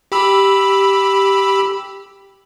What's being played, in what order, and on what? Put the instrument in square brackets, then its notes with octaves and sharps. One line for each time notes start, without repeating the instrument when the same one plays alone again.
[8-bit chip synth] G4 B5 E6